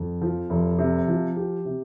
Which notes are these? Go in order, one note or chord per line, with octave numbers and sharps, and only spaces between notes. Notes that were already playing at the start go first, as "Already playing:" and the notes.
Already playing: F2
F3
F1
C3
F3
G4
C3